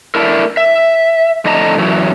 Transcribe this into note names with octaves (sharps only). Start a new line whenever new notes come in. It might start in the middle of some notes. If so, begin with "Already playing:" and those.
A3 D4 E4 A#4
E5
F2 A2 D3 D#5 A5 A#5
F#2 E3 F#3